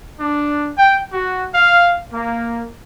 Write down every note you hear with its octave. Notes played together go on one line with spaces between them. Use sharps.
D4
G5
F#4
F5
A#3